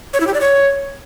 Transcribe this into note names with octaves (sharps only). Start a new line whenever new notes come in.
C#5
E4
G4
D5
C#5